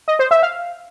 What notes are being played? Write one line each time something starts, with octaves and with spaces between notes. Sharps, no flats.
D#5
C5
E5
F5